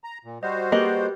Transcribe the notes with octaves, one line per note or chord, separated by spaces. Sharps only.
A#5
A#2
G3 F#4 C5 D#5
A#3 G4 G#4 B4 D#5